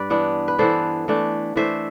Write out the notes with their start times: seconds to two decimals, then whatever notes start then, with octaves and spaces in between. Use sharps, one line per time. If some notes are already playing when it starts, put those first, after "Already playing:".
Already playing: G2 B4 D5
0.10 E3 B3 D4
0.48 B4
0.58 E3 B3 D4 A4 C5
1.08 E3 A3 D4
1.56 E3 A3 D4 C5 E5